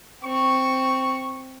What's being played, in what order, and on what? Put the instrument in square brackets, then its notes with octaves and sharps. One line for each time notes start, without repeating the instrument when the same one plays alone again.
[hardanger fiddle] C4 [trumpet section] C#6